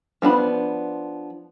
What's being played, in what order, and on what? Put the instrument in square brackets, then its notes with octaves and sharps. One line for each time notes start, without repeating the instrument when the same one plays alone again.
[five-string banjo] F3 B3 D4 B5